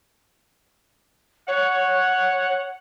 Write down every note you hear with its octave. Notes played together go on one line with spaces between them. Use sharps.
C#5 F#5